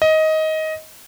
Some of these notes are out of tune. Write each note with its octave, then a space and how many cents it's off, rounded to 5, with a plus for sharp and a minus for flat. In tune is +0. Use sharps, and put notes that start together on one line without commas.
D#5 +15